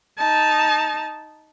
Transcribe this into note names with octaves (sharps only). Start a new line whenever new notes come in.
D#4 A5